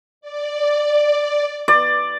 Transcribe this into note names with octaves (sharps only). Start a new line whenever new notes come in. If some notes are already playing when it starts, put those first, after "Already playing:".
D5
D5